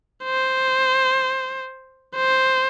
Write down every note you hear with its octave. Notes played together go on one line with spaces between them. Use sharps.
C5
C5